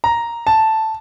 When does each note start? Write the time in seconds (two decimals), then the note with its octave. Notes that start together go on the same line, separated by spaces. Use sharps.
0.04 A#5
0.47 A5